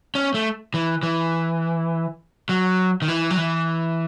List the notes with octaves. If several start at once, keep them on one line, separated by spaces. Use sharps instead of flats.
C#4
A3
E3
E3
F#3
D#3
E3
F#3
E3